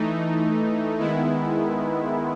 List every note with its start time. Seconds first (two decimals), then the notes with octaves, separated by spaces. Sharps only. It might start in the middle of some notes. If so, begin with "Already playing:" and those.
Already playing: E3 A3 D#4
0.99 D#3 G#3 B3 E4